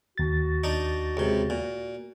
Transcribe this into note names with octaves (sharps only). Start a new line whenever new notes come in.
D#2 F#4 A6
D4 D#4
C#2 C3
A#2